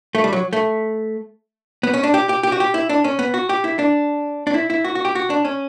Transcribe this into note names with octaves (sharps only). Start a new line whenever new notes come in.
A3
G3
F#3
A3
B3
C#4
D4
G4
G4
G4
F#4
G4
E4
D4
C#4
B3
F#4
G4
E4
D4
D4
E4
E4
F#4
F#4
G4
F#4
D4
C#4